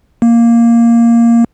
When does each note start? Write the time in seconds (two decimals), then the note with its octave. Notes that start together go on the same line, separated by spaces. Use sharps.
0.22 A#3